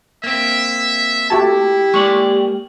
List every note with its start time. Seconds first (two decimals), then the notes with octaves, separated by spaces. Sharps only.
0.24 A#3 C4 E5
1.30 A3 E4 F#4 G4 A5
1.94 G#3 A#3 D5 C#6